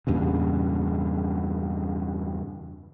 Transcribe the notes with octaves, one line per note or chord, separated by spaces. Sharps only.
E2 G2 A#2 C#3